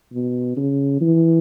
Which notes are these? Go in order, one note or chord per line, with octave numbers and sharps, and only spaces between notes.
B2
C#3
E3